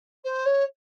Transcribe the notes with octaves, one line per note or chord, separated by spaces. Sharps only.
C5
C#5